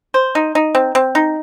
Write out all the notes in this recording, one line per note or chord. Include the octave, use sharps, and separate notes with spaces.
C5
D#4
D#4
C4
C4
D#4